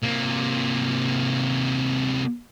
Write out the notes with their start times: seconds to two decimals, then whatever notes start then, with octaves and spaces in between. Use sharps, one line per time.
0.03 C3 A#3